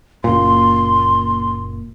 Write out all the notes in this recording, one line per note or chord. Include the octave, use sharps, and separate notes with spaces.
F#1 A#2 C6